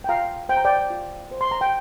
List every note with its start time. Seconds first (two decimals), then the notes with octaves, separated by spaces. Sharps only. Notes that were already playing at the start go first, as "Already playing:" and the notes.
0.04 G5
0.09 F4 F5 A#5
0.49 C5 G5
0.57 A#5
0.65 D5 G5
0.90 F4
1.32 C5
1.41 C6
1.51 A#5
1.61 G5